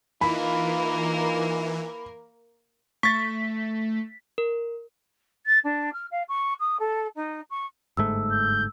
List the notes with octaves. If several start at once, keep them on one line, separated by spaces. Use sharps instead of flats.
E3 A#3 D#4 F4 A#4 B5
A3 C#6 A6 B6
A#4
A6
D4
F6
F5
C#6
D#6
A4
D#4
C#6
G1 G#2 A3 E6
G6